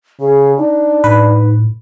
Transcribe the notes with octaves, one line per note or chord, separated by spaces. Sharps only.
C#3 G#4
D4 D#4
A2 B4